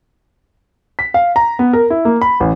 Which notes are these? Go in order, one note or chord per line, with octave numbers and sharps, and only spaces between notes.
B6
F5
A#5
B3
A#4
E4
A#3
B5
A1